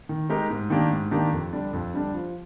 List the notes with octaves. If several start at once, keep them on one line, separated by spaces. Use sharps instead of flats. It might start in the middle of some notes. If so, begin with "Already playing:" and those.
D#3
G#3 D#4 G4 A#4
G#2
D#3 A#3 D4 G4
G#2
D#3 A#3 D4 G4
F2
D3 G3 D4
F2
D3 G3 D4
F3